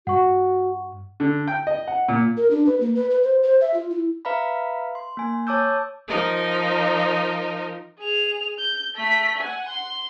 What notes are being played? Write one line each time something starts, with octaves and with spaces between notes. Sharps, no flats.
G2 F#4 F#5 C#6
D3
G5
D#5
F#5
A#2
A#4
D4
B4
A#3
B4
B4
C5
C5
E5
F4
E4
B4 E5 F5 A#5 B5
C6
A#3 G#5
C#5 A5 D6 E6 G6
F3 D#4 A#4 D#5
G#4 F7
G6
A3 B6
F#5 G#5
C6